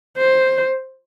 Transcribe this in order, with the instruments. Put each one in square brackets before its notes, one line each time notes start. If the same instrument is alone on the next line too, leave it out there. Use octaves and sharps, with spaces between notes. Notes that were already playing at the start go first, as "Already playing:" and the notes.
[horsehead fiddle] C5